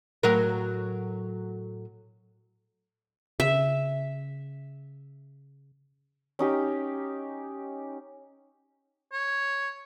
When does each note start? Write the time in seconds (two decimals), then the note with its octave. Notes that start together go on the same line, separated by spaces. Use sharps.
0.23 A2 F#3 A#4
3.40 C#3 E5
6.39 C#4 D#4 G4
9.13 C#5